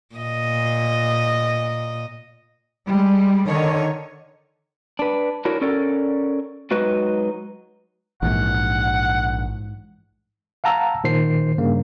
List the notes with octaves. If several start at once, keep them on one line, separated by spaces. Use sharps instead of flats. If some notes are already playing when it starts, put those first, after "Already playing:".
A#2 D#5
G3 G#3
D3 D#3 C#5
D4 B4
D4 E4 F#4 A#4 C#5
C#4 A4 A#4 D5
F#3 G#3 D#4 F#4 B4
A#1 G#2 E3 F#5
F5 F#5 A5 A#5 E6
A#2 D#3 C5 C7
G2 C#3 A#3